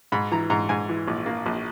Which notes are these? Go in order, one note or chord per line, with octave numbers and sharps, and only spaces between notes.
G#2 B5
E3 A#5
G#2 A#5
G#2 G#5
E3
A#1
A#3
A#1